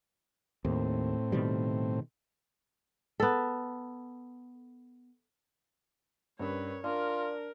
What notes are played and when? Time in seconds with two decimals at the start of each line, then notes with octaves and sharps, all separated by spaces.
0.65 D#2 A2 C4
1.32 B2 D#3 G3
3.20 B3 A4
6.39 G2 C#4 A#4 B4 C#5
6.84 D4 F4 A#4 D5